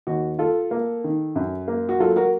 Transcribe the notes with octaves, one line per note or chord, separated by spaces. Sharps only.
D#2 F#4
F4 A4
A#3
D#3
F#2
A#3
F#4
F#3 F4 A4
F#4 A#4